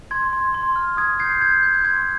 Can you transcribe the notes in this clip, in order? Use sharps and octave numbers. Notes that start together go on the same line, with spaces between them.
C6 G#6
C6
C6
F6
D#6 G#6
G6 G#6 C7
G6 G#6
G6
C6 G#6